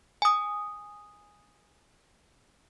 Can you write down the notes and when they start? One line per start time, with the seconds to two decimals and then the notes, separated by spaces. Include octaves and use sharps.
0.22 G#5 D#6